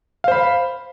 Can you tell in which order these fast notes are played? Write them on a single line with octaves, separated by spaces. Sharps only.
F5 C5 B5